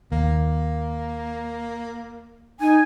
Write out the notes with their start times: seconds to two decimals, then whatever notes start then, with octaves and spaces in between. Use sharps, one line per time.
0.12 D#2 A#3
2.61 D#4 G#5